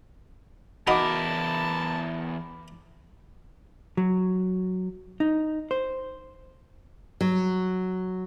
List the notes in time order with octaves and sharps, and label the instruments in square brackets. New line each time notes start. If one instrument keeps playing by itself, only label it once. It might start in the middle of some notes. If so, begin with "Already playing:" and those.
[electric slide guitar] E2 A#4 [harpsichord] D#4 F#4 F5 [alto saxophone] A5 [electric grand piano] B5 D6
[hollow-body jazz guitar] F#3
D#4
C5
[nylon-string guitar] F#3